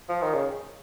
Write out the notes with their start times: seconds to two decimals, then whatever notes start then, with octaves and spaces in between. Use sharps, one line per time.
0.09 F3
0.22 D#3
0.34 C#3